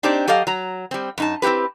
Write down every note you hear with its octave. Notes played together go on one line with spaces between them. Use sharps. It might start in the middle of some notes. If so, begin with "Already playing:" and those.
C4 D4 D#4 G4 C5 D5
F#3 G4 A4 D#5 F5
F#3 A#5
G3 C4
F#2 D#4 A5
C4 E4 F#4 G4 B4